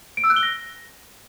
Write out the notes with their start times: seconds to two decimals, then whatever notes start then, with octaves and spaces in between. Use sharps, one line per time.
0.17 D7
0.24 E6
0.30 F#6
0.36 G7
0.43 A#6